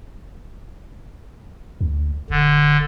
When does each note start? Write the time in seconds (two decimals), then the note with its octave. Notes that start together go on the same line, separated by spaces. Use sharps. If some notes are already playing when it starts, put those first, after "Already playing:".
1.81 D2
2.30 D#1 D3